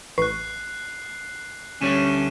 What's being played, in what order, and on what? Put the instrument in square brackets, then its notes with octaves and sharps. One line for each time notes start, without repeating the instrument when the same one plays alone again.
[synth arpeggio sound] A1 B4 C#6 [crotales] F#6 C7
[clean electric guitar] D2 G3 A3 [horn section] C#4 [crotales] D#7 E7